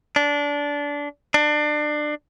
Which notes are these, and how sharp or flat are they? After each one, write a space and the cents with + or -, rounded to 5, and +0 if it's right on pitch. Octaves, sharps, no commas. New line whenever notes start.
D4 -20
D4 +25